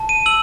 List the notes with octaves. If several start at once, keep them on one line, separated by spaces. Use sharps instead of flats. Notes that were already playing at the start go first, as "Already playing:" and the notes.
Already playing: A5
D#7
E6 F#7